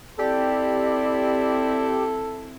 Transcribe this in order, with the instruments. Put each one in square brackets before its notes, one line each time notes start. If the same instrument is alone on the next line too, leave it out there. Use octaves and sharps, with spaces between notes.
[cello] C4 E4 [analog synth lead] G4 [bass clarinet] A4 [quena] D5